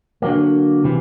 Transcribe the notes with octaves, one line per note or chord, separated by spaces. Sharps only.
D3 F#3 A#3
C3 E3